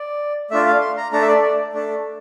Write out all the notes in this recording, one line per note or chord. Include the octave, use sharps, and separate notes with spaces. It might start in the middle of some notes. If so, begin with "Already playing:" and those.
Already playing: D5
A3 D4 F4 E5
F5
C6
A#5
A3 D4 A4 A#5
E5
D5
D5
A3 D4 A4